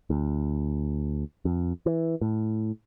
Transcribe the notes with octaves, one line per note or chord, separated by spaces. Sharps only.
D2
F2
E3
A2